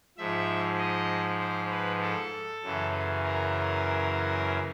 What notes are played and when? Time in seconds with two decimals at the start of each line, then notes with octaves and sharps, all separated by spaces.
0.18 G#2 F3 E5
0.79 D#5
1.40 C5
1.71 B4
2.02 A4
2.63 F#2 C#3 E3
3.24 A#4